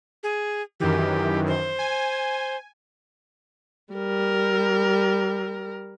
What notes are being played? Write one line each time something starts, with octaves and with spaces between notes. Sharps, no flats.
G#4
F#2 D#3 E3 G4
C5
G#5
G3 A#4